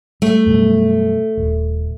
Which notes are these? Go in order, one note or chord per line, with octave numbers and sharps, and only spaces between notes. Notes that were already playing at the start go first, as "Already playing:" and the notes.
G3 A3
F#2 B2 G3
D#1